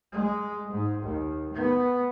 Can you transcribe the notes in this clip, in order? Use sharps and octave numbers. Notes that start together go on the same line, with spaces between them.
G#3
G#2
D#2
B3